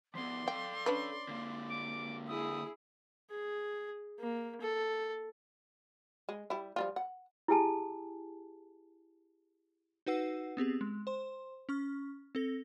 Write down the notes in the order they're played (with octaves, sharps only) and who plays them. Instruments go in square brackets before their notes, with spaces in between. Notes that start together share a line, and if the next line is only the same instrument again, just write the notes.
[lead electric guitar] F3 B3 [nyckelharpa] D5 [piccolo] C6
[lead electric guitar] A4 F5 [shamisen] G5
[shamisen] C#4 D4 B4
[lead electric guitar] D3 A#3
[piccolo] D6
[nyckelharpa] E4 G#4 [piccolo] D#6
[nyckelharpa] G#4
A#3
A4
[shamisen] G#3
G3 E4
F3 G3 F4
F#5
[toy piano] E4 G4 G#4 G#5 A5
[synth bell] D#4 F#4 B4 F#5 E6 C7
B3 C4 G4 G#4
G#3
C5 C6
C#4 C#6 F6
C4 A4 A#6